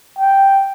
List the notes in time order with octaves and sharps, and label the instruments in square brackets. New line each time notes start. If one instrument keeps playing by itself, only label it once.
[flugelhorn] G5